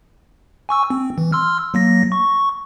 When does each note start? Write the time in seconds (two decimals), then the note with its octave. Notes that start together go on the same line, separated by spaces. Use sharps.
0.69 G#5 C#6 E6
0.90 C4
1.18 E3
1.32 C6 E6 F6
1.74 F#3 A#3 A#6
2.12 C#6